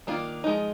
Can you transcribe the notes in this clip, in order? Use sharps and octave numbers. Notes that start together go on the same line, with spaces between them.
D#3 A#3 D4 F4
F3 G#3 D#4